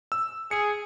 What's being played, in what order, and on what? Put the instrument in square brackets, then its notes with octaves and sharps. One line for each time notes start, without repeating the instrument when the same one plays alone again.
[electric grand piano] E6
[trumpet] G#4 [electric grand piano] C#7